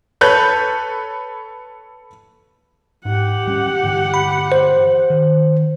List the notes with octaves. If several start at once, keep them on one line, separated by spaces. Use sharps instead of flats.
A4 B4 C#5 F#6 G6
G#2 G4 F#5
D1 G3 C#4
G2 D3 E3
B5
C5
D#3